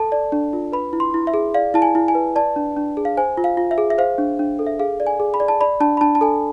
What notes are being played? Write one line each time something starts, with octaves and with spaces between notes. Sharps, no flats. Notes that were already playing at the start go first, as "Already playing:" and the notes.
Already playing: A4 A5
D5
D4
F4
B4 B5
E4
C6
E4
E5
G#4
D5 F5
E4 A5
G#5
E4
G#5
B4
D5 A5
D4
D4
G#4
F5
C5 G#5
F4
F5
F4
E5
G#4
E5
C5 F5
D4
D4
A4
E5
G#4 F5
D5
G#5
G#4
B5
D5
A5
D5 B5
D4 A5
B5
D4 A5
A5
A4 G#5